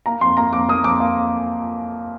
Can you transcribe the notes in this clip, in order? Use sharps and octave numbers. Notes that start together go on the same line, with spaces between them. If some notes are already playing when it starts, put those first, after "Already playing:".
A#3 A#5
F2 C6
A#3 A#5
F2 D6
A#3 D#6
F2 D6
A#3